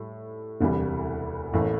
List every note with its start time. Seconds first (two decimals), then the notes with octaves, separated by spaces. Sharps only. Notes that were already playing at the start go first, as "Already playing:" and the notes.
Already playing: A2 G3
0.61 E1 D2 C3 E3 G3
1.53 A1 A2 E3 A#3